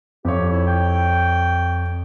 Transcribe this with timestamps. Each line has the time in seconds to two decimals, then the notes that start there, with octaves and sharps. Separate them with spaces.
0.25 F2 G4 C#5
0.51 E4
0.67 G5